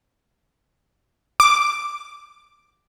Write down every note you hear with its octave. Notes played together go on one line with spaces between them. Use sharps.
D6